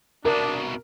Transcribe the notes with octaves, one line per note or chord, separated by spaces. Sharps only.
C2 B2 D4 A#4